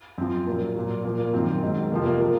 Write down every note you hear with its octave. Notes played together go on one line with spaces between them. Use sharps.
F#2 F3 C4
A#2 F#3 A#3
A#2 F#3
A#2 F3 A#3
A#3
F#2 D#3 F#3 C4
G#2 D#3 F#3
F2 C3 F3 A#3
A#3
C#3 F3 A#3